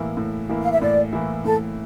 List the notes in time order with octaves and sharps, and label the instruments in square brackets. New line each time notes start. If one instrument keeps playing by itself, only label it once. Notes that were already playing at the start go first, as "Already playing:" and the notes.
Already playing: [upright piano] A2 E3 A#3 E4
A2
E3 A#3 E4
[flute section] F5
E5
[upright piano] A2 [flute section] D5
[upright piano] E3 A#3 E4
[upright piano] A2 [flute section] A4